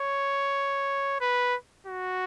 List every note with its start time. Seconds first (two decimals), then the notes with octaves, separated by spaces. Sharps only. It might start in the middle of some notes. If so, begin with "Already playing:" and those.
Already playing: C#5
1.21 B4
1.87 F#4